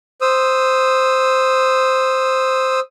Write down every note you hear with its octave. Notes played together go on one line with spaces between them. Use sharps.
C5 D#6 E6